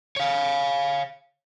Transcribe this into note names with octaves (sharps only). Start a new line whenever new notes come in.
C#5 F5